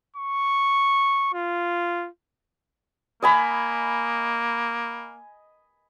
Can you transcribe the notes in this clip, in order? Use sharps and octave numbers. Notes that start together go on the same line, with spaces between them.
C#6
F4
A#3 D#5 G#5 B5